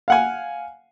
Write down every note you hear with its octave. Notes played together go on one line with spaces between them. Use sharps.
F5 F#5 G#5